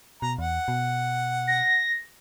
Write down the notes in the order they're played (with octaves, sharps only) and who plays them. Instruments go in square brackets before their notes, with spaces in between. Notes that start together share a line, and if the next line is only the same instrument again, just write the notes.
[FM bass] B2 [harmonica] A#5
[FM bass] E2 [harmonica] F#5
[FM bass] B2
[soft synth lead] A#6